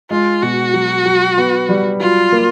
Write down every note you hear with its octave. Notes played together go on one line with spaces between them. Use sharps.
G#3 F4
B2 F#4
F#3
F#3
B3
G3
F#3 F4
A#3